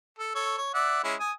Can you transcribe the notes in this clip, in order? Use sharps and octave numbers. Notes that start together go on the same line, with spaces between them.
A4
A4 C#5
C#5
D5 E5 F#5
G#3 C#4 E4
G#5 D#6